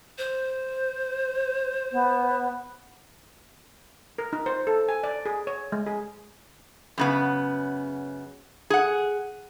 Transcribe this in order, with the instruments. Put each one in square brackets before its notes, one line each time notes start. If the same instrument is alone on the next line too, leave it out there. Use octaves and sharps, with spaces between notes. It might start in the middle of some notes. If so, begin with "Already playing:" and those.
[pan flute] C5
[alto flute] B3
[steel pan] A#4
D#4
C5
A4
G#5
D5
G#4
C#5
G#3
G#4
[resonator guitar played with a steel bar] F#2 C#3 B3
G#4 F#5